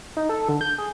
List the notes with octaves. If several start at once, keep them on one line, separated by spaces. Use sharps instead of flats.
D#4
A4
D3
G6
G#4